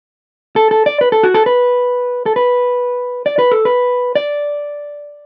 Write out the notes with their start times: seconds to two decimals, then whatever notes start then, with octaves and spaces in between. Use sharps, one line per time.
0.56 A4
0.71 A4
0.86 D5
1.01 B4
1.12 A4
1.23 F#4
1.34 A4
1.46 B4
2.26 A4
2.36 B4
3.26 D5
3.39 B4
3.52 A4
3.65 B4
4.15 D5